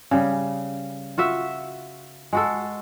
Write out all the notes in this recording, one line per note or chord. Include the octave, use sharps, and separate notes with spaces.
C#3 G3
F4 F#4 E5
G#3 F#4 A4